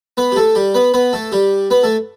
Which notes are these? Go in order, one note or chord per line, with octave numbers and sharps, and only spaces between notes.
B3 B4
G4
A3 A4
G3 G4
B3 B4
B3 B4
A3 A4
G3 G4
B3 B4
A3 A4